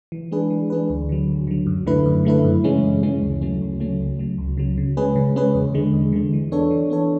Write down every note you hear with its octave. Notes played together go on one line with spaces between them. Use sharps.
E3
G#3 D4 G#4 B4
E3
G#3 D4 G#4 B4
D2
D3 F#3
D2
D3 F#3
F#2
D3 A3 E4 B4
F#2
D3 A3 E4 B4
F#2
C#3 E3 G#3 C#4
F#2
C#3 E3 G#3 C#4
D2
C#3 F#3 A3 C#4
D2
C#3 F#3 A3 C#4
C#2
C#3 F#3
C#2
C#3 F#3
C#3
G#3 C#4 G#4 B4
C#3
G#3 C#4 G#4 B4
E2
D3 G#3
E2
D3 G#3
E3
B3 D4 A4 C#5
E3
B3 D4 A4 C#5